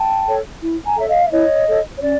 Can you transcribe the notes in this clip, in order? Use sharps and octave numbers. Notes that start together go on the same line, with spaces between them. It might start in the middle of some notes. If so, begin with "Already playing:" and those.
Already playing: G5 A5
A4 C#5
E4
G#5 A#5
A4 C#5 E5
D#5 F5
E5
E4 C#5 D#5
A4 C#5
C#5
C#4 D5